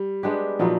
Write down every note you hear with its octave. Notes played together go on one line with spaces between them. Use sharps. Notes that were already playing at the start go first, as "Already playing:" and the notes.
Already playing: G3
G#3 B3 D4 G4
A#2 F3 F#3 B3 D#4